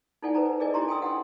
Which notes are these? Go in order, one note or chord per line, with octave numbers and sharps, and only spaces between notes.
D#4 E4 A4 D5 F#5 G#5
B4 C5 A#5
G#4 A#4 D5 D#5 G#5
D4 E4 G4 A#5 C6
A4 G5 G#5 C6 D#6 E6
F#5 G5 C6